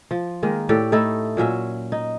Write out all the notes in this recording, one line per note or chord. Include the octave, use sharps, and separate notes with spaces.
F3
D#3 G#3 A#3
A2 G4 A4 D5
A3 D#4 E4 A4
A#2 F#3 C#4 E5
D#4